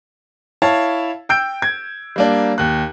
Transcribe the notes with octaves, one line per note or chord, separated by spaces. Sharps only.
E4 C#5 F5 A5
G5 E6 G6 D7
G#6
G3 A#3 D4
D#2 F#6